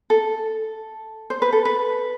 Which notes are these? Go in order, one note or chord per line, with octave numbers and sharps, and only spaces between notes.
A4
C5
B4
A4
B4